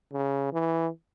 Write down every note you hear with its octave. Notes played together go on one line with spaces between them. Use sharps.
C#3
E3